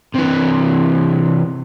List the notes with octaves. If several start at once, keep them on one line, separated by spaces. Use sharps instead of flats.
C3 E3